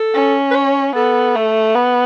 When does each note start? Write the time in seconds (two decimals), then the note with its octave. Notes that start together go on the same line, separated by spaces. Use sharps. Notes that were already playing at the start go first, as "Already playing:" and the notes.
Already playing: A4
0.15 C#4
0.51 B4
0.55 C#5
0.95 B3 A4
1.36 A3
1.75 B3